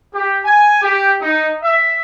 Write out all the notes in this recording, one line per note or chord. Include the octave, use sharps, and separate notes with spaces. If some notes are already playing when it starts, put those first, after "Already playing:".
G4
G#5
G4
D#4
E5